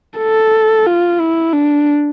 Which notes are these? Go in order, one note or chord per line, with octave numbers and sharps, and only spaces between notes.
A4
F4
E4
D4